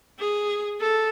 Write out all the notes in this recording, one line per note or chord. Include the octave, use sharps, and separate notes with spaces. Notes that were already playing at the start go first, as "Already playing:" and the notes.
G#4
A4